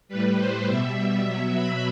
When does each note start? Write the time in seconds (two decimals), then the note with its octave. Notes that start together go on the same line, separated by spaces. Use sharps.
0.09 A2 G3 B4
0.37 C5
0.67 B2 G3 E5
1.26 B2 F#3
1.55 B5